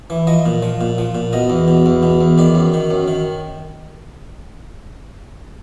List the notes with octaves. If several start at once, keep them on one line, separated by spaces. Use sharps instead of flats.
E3
F3 D#5
A#2
F3
A#2
F3
A#2
B2 D#5
E2
B2
E2
B2
E2
D#3 D5
F#2
D#3
F#2
D#3